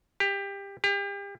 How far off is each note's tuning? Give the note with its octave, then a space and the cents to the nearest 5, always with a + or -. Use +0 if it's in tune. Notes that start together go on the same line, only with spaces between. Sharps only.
G4 +20
G4 +35